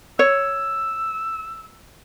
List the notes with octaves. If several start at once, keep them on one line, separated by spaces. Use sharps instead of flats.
C#5 E6